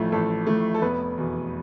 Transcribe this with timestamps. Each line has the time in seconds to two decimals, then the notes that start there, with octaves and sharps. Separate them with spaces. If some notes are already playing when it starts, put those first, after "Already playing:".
Already playing: A1 A2 F3 A3
0.12 A1 A4
0.47 A2 F3 A3
0.74 A4
0.81 F1 B3 B4
1.17 E2 B2